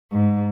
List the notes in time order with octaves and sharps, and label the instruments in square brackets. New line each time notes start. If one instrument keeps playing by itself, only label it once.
[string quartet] G#2